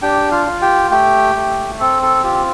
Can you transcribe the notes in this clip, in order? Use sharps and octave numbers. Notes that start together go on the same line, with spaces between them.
D4 G4 G5
F4 F5
F4
G4 G5
A3 G4 G5
A3
C4 A4
A4
F4 G4